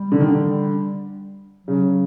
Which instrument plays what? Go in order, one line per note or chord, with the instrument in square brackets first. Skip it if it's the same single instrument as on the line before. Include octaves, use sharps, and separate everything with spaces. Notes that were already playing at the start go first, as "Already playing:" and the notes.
Already playing: [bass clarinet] G3
[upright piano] D3
D#3
D3
[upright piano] C#3 [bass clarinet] F#3